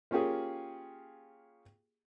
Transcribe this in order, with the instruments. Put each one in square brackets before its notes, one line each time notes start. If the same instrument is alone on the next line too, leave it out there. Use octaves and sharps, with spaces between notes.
[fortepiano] A#3 C#4 F4 G4 G#4